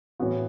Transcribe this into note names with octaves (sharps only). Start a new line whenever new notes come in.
A2 E3 B3 F#4